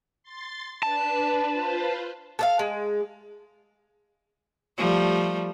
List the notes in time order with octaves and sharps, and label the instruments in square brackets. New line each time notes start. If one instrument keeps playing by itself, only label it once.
[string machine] C6 A6
[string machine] D4 B4 [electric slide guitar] A5
[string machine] F4 B4 C5
[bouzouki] A4 A#4 F5
G#3
[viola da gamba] F3 G3 A3